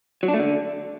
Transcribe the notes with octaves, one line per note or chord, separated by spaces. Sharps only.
F#3
D4
A3
D3